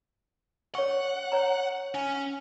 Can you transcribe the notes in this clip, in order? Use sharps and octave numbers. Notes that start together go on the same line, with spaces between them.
C#5 F#5 C#6
C#5 A#5
C#4